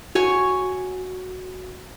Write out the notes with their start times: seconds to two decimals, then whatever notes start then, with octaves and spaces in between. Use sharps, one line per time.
0.15 F#4 C#5 G#5 C#6